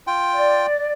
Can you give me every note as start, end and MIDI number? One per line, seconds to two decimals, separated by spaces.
0.07 0.66 65
0.07 0.66 79
0.33 0.92 74